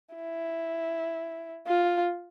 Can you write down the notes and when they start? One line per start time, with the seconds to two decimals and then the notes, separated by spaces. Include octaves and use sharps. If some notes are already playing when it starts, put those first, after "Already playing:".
0.15 E4
1.67 F4